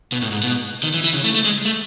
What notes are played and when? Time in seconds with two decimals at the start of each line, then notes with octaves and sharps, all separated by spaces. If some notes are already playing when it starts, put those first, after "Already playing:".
0.12 B2
0.22 A2
0.32 G#2
0.43 B2
0.83 D#3
0.94 E3
1.04 E3
1.14 C#3
1.24 A3
1.34 A3
1.44 G#3
1.65 A3